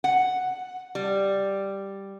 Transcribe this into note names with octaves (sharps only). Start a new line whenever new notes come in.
F#5
G3